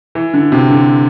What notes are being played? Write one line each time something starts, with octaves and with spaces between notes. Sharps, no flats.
E3
D3
C3
D3